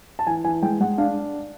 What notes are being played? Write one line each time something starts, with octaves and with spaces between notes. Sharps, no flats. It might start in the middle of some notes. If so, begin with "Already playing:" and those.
A5
E3 G#5
E3 G#5
G#3 G5
G#3 F#5
D4 F5